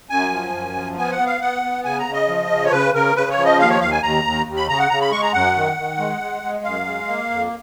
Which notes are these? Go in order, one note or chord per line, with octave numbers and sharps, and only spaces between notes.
F#2 G#5
F3
F#2
F3
B3 G#5
F#5
B3
F5
B3 F#5
B3
C#3 G#5
A#5
C#3
D#5
F3
C#3
C#5
C#3 B4
C#3 A#4
C#3 B4
C#5
F3
D#5
D#2 F5
C#5
D#2 F5
G#5
D#2 A#5
D#2
D#2
B5
C#3 A#5
F#5
C#3 A#5
B5
G#3 C#6
A#5
F#2 F#5
D#3
D#3
G#3
G#3
G#3
F#2 F5
G#3
A#3
F2